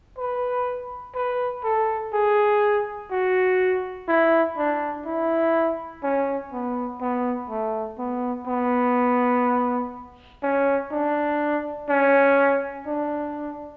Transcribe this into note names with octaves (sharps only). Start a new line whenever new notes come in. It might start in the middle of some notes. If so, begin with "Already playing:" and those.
B4
B4
A4
G#4
F#4
E4
D4
E4
C#4
B3
B3
A3
B3
B3
C#4
D4
C#4
D4